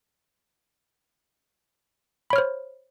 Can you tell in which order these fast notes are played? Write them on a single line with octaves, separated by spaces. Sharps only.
B5 C#5 F6 C5